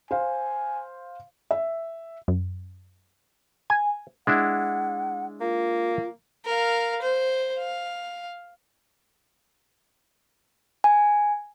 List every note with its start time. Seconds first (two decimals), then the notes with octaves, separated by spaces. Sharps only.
0.11 C5 F5 G#5
1.51 E5
2.28 F#2
3.70 G#5
4.27 G#3 D4 E4 F#5
5.40 A#3 F4
6.45 A#4 F5
7.02 C5
7.58 F5
10.84 G#5